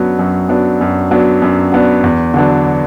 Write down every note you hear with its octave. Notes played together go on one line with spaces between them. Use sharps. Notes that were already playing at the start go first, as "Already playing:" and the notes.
Already playing: F#2 F#3 B3 D4
F#2
F#3 B3 D4
F#2
F#3 B3 D4
F#2
F#3 B3 D4
E2
D3 F#3 B3 D4